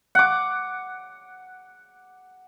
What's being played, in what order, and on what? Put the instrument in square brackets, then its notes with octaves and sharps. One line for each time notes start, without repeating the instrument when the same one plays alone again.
[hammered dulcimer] F#5 D6